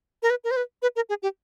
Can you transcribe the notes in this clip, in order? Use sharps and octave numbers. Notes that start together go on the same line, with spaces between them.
A#4
B4
A#4
C5
B4
B4
A#4
G#4
G4